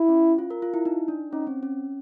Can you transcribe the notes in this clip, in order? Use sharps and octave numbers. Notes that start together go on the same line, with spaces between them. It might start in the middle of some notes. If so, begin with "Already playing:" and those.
Already playing: E4
C#4
F4
A#4
F4
E4
D#4
D4
C#4 D#4
C4
C#4